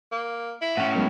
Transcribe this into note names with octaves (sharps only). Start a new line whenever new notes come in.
A#3
E4
A2 C#4 F#5
D#3 F#3 G#3 B3